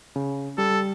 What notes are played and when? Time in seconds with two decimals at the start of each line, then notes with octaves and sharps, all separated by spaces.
0.16 C#3
0.58 G3 A4